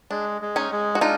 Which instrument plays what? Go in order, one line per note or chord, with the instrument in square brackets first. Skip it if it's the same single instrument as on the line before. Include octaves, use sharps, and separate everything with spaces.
[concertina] G#3 [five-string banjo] D4
[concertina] G#3
[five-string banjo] C#4 D#4
[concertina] G#3
[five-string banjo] F#4
[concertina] D4 [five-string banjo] D#4 F4